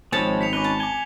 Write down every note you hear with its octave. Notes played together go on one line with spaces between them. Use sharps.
G#1 F3 G#3 C4 C#5 A5 B5
B6 C#7 F7
C#4 D#4 B4 D6 G7
A5
G#5 D6 G7